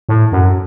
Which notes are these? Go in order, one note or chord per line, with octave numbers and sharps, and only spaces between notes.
A2
F#2